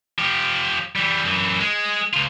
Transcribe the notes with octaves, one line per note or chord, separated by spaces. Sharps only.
F3 G4
E3 G3
F#2 E3
G#3
C#2 F4